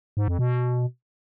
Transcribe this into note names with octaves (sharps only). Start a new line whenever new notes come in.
G#2
F2
B2